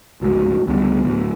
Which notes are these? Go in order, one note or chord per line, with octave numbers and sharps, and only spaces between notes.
G1 C#2 G#2 F#4
C#2 D3 G3 B3
D2 A2 F#3